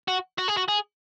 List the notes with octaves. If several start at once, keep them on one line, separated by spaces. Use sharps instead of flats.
F#4
F#4
G#4
F#4
G#4